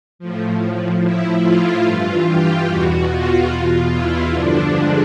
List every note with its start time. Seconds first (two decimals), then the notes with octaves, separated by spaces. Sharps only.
0.19 A2 F3
1.02 A2 F3 E4
1.43 F4
1.85 G2 E3
2.26 G4
2.68 E2 B2 F#4
3.10 F4
3.50 B2
3.55 E2
3.91 E4
4.33 G2 D3 F3 D4
4.75 G#3